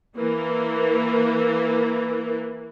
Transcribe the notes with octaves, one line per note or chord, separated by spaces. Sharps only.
E3 A#3